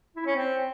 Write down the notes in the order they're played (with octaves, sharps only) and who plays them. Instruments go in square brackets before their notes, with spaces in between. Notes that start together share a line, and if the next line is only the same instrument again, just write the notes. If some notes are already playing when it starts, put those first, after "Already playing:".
[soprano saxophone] E4
C#4
C4